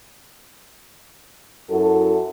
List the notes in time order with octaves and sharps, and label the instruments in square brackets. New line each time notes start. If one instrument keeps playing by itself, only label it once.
[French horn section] F#2 E4 F#4 A4